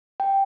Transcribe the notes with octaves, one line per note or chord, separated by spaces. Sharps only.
G5